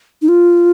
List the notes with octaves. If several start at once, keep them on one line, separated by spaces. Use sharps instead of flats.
D#4
F4